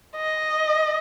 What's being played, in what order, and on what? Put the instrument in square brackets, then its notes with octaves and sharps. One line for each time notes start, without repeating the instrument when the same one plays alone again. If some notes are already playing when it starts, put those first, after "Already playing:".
[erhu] D#5